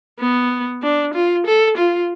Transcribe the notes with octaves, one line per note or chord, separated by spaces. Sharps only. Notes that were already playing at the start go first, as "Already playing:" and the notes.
B3
D4
F4
A4
F4